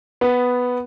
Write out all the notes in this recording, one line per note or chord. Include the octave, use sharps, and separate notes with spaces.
B3